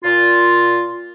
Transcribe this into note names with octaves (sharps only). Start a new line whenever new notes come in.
A#2 F4